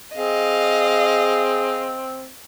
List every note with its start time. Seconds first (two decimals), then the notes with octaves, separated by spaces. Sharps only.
0.17 C4 G#4 D#5 F5